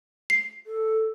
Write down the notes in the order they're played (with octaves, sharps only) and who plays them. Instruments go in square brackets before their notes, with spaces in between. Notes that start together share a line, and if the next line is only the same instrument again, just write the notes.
[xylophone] C7
[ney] A4